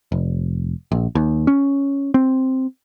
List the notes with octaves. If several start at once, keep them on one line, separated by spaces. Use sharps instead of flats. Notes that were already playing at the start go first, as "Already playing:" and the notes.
F1
A#1
D#2
C#4
C4